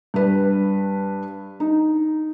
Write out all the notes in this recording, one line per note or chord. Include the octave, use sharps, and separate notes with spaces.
G2 B4
D#4